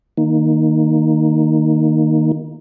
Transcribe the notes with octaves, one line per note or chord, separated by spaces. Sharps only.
D#3 A#3 D#4